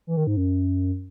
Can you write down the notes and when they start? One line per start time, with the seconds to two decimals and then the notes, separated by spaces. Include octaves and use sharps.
0.07 E3
0.17 D#3
0.27 G#2
0.37 F#2